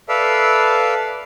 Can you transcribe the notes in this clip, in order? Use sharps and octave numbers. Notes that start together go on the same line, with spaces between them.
A4 B4 D5 E5 F5